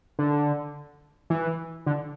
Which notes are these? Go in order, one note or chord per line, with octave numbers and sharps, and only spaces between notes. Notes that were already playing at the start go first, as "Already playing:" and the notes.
D3
E3
D3